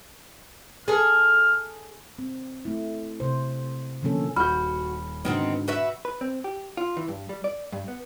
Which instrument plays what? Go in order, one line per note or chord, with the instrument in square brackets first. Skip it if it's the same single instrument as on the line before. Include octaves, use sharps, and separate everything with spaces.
[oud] G#4 A4 [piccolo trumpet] F6
[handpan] C4
A3 E4
C3 C5
B2 D3 F3 A#3 C#4 A4
[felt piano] D#1 G6 [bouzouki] F#4 [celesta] B5 F6
[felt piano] G#2 B2 D3 [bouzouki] D#3 B3 C4
[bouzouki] F#4 B4 E5
[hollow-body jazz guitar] B4
C4
G4
F4
E3
G2
G3
D5
G2
B3